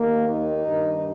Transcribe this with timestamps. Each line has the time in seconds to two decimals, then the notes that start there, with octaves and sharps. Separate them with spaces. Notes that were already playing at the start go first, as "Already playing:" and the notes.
Already playing: D#2 D#3 A#3
0.27 D#4
0.64 G2 D#3